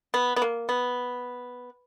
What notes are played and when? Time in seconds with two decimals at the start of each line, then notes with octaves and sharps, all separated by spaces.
0.14 B3
0.36 B3
0.42 A#3
0.69 B3